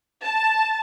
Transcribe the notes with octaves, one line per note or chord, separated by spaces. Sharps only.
A5